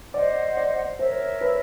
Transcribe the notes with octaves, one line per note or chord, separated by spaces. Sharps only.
C5 D5 D#5 F#5
D5
A#4 C5 C#5 E5
B4